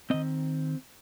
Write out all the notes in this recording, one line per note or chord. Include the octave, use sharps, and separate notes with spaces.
D#3 C4 D#5